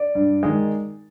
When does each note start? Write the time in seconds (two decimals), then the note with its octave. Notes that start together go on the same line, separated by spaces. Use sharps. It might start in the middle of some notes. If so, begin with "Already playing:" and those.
Already playing: D5
0.15 G2
0.43 D#3 G#3